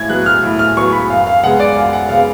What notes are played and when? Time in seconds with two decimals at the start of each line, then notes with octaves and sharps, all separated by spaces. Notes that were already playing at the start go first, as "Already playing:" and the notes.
Already playing: A2 G#6
0.09 F#3 B3 F#6
0.26 F6
0.43 A2
0.59 F6
0.77 F#3 B3 C#6
0.92 B5
1.09 F#2 F5
1.27 F5
1.43 C#3 G#3 B3 F#5
1.60 D5
1.76 F#2 F5
1.93 F#5
2.09 C#3 G#3 B3 F5